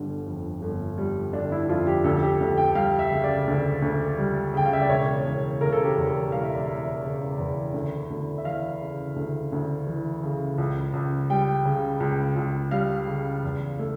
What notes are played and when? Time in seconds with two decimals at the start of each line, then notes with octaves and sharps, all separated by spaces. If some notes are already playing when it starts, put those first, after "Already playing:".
Already playing: G1 D3 G3
0.26 F2
0.62 G1
0.98 G3
1.33 D3 D4
1.52 E4
1.69 F2 F4
1.87 G4
2.04 D2 A4
2.23 G4
2.41 D2
2.57 G5
2.75 G3 F5
2.99 E5
3.11 C#3
3.24 D5
3.48 D2
3.82 D2
4.18 G3
4.54 C#3 G5
4.65 F5
4.73 E5
4.81 D5
4.89 E1 C#5
5.25 E1
5.61 C#3 A#4
5.72 A4
5.84 G4
5.97 E2
6.07 A4
6.32 E1 F5
6.43 E5
6.55 D5
6.67 E1 E5
7.02 C#3
7.39 E2
7.74 D2
8.10 D2
8.38 E5
8.44 E3 F5
8.80 C#3
9.16 D2
9.52 D2
9.87 E3
10.23 C#3
10.58 C#2
10.94 C#2
11.30 G3 G5
11.65 C#3
12.00 C#2
12.36 C#2
12.71 G3 F5
13.07 C#3
13.43 E2
13.79 A3